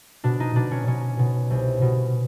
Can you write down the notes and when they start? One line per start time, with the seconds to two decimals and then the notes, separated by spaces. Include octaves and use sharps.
0.24 B2 D4
0.40 D#4
0.55 B2 D4
0.71 C#4
0.87 B2 C#4
1.19 B2
1.50 C2
1.82 B2